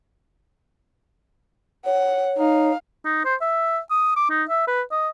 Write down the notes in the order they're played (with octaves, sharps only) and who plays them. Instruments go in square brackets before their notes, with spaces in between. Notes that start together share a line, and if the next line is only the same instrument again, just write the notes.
[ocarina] C#5 [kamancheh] F#5
[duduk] D#4 [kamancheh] F5
[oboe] D#4
C5
E5
D#6
D6
D#4
E5
B4
D#5